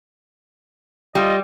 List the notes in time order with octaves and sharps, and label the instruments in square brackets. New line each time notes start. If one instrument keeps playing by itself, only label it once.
[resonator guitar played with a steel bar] G3 [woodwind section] F4 D#5